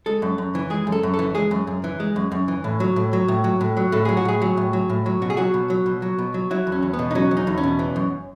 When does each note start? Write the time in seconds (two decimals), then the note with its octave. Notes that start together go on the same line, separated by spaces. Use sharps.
0.06 G#3 A4
0.22 F#2
0.38 F#2
0.55 E3
0.70 G#3 G#4
0.87 F#2
0.92 A4
1.03 F#2
1.14 A4
1.19 E3
1.35 G#3 G#4
1.51 F#2
1.67 F#2
1.84 E3
2.00 G#3
2.16 F#2
2.32 F#2
2.48 E3
2.64 A2
2.80 F#3
2.96 A2
3.13 F#3
3.28 A2
3.44 F#3
3.61 A2
3.77 F#3
3.92 A2 A4
4.05 F#3 G#4
4.17 F#4
4.25 A2 G#4
4.42 F#3
4.57 A2
4.73 F#3
4.90 A2
5.06 F#3
5.22 B2 F#4
5.30 G#4
5.37 F#3 F#4
5.54 B2
5.70 F#3
5.86 B2
6.02 F#3
6.19 B2
6.34 F#3
6.51 F#3 E4
6.67 E2
6.72 C#4
6.82 E2
6.93 B3
6.99 B2
7.11 D#4
7.15 F#3 C#4
7.31 E2
7.37 D#4
7.47 E2
7.58 C#4
7.63 B2
7.79 E3
7.96 F#2